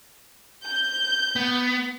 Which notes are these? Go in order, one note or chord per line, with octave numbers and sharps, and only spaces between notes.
G6
B3